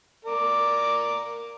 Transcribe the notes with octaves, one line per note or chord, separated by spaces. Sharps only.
A#4 D5